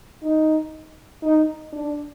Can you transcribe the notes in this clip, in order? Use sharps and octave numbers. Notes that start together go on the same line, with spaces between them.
D#4
D#4
D4